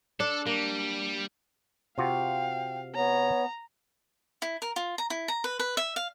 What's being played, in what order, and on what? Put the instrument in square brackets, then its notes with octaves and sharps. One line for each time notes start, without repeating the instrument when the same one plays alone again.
[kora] D4 [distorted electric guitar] A4
[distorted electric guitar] G3 [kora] A#3
[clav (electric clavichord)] C3 F4 F#4 [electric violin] F5 [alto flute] G5
[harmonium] B3 [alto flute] C#5 [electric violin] A#5
[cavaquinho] E4
A#4
F4
A#5
E4
A#5
B4
B4
E5
F5